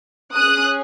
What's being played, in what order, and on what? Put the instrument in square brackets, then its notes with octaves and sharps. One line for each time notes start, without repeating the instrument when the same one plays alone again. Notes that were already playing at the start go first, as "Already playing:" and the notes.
[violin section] C#4 G#4 D#6 F#6